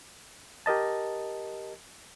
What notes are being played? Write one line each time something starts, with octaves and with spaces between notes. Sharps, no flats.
G4 A#4 D#5 A5